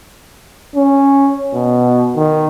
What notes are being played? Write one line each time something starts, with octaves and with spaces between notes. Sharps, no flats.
C#4
B2
D#3